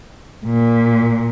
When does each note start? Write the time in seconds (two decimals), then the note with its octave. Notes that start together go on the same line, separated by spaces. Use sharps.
0.45 A#2